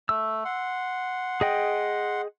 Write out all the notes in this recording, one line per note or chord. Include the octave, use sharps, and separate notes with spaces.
A3 E6
F#5 C6
G#4 D#5 G5